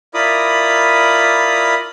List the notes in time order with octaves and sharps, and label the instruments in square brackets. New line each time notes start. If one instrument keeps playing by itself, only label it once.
[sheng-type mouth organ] E4 F4 A#4 D5 B5 D#6